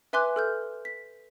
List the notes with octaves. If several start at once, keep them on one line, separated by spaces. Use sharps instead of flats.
B4 E5 G#5 C6 D6 F#6
A4 F6 G6
B6